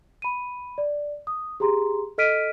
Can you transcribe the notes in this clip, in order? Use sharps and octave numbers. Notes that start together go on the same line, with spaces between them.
B5 D#7
D5
D#6
G4 G#4 A#5 C6
A4 D#5 F6 B6 D7 D#7